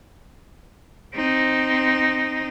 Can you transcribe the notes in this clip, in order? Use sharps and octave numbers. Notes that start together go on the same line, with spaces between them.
C4 D#4